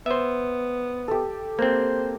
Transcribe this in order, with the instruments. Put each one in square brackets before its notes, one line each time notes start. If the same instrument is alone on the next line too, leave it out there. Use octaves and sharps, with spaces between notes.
[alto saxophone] B3 [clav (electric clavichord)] C5 E5
[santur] G4 A4
[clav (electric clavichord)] A#3 C4 [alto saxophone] C5